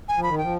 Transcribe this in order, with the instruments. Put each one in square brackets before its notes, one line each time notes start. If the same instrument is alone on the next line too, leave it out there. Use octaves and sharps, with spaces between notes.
[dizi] G#5
[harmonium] F3
[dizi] B5
[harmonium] D#3
[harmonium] F3 [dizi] G5